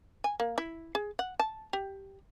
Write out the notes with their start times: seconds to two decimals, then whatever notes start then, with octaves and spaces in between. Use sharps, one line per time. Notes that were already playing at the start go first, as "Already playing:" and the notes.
0.24 G#5
0.40 A#3
0.58 E4
0.95 G#4
1.19 F#5
1.40 A5
1.73 G4